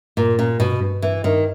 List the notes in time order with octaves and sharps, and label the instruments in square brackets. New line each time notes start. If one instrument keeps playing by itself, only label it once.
[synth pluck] G2 [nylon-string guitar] A#2
[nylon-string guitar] A#2 [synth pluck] C#4
[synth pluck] G2 [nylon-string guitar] B2
[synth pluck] G2
[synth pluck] G2 [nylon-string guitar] E3
[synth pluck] G2 [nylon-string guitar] D#3